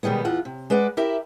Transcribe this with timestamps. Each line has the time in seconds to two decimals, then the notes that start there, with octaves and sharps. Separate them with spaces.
0.03 B2 D#3 G3 G#3 B3
0.25 E2 F4 F#5
0.45 C3
0.70 G#3 B4 D5 F#5
0.97 E4 G4 A#4 E5